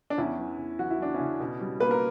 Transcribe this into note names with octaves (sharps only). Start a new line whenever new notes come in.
D4
E2 C#4 E4
E3
E2
E3 F#4
E4
E3 D4
C#3 C#4 E4
B2
G3
A#3 B4
A#4